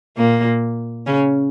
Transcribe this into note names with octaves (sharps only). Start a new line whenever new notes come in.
A#2 A#3
C#3 C#4